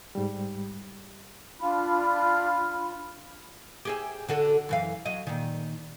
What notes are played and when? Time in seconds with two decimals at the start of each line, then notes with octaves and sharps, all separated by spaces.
0.15 G#2 G3
1.59 D4 F4 B5
3.85 G4 G#4 E5
4.29 D3 F#4 A4
4.69 F#2 E3 F5
5.05 F#3 D#5
5.27 A#2 D#3